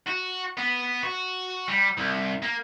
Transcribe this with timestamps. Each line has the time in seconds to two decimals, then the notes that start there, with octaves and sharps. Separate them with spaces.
0.07 F#4
0.57 B3
1.03 F#4
1.68 G3
1.97 C2
2.43 A#3